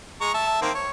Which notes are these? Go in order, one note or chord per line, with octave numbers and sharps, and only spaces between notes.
G#3 A#5 C#6
E5 A5
D#3 A#3 C4
C#5